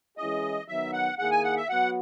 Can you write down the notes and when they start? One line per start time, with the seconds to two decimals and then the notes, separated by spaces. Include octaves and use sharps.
0.18 E3 G#3 C#4 E4 G#4 D#5
0.68 D#3 F#3 B3 D#4 E5
0.93 F#5
1.19 D#3 A#3 E4 G#4 F#5
1.31 G#5
1.44 F#5
1.57 E5
1.69 F#3 B3 F#4 F#5